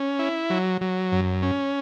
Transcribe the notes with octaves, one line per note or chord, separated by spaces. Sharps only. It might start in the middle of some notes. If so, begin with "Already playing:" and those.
Already playing: C#4
E4
F#3
F#3
F#2
C#4